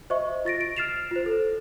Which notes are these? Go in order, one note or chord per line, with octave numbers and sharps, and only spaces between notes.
C5 D#5 E5 C#6
F4 A6 A#6 D7
D7
F6 A6 C7 E7 F7
F4 C5
A4